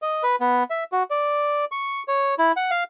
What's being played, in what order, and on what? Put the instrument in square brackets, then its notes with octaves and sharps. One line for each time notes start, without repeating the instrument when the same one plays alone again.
[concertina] D#5
B4
B3
E5
F#4
D5
C#6
C#5
E4
F#5
F5